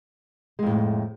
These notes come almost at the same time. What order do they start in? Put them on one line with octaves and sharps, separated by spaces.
G#3 F2 A2